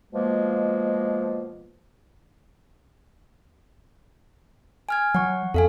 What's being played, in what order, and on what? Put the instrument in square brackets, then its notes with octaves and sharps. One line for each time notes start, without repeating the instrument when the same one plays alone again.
[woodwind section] B2 F3 G#3 A#3
[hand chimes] G#5 F6 G#6
[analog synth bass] F#3 [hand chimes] F#5 C#6
[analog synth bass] F2 [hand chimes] A4 F5 G#5